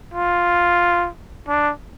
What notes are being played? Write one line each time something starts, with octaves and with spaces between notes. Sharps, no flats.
F4
D4